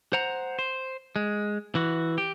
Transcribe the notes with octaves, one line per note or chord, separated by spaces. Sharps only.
C5 F#5 A#5
C5
G#3
E3 F#4
G4